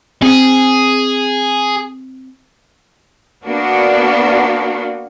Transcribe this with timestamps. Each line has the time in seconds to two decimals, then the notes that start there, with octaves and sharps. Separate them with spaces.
0.22 C4 G#4
3.44 A#3 B3 D4 F#4